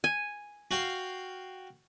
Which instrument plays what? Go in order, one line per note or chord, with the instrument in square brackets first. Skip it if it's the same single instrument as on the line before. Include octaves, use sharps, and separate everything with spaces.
[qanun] G#5
[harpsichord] F#4 F5 G5